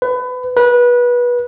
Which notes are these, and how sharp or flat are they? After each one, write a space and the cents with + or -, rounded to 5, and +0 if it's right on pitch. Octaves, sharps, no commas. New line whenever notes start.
B4 +25
B4 -25